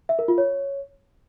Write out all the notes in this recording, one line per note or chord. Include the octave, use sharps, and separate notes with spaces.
E5
A#4
F4
C#5